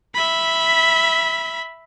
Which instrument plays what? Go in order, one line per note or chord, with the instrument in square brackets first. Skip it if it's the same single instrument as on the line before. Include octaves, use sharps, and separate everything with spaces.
[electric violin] E5 B5